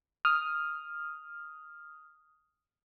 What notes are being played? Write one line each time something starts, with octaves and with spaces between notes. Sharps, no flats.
D#6 F6